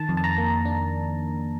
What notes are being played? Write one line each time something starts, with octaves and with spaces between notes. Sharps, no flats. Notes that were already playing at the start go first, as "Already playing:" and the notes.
Already playing: D#3 A5
F2
A5
A#5
A#3
D4